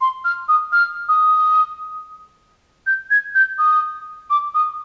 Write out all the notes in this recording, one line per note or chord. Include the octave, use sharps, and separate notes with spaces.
C6
F6
D#6
F6
D#6
G6
G#6
G6
D#6
D6
D#6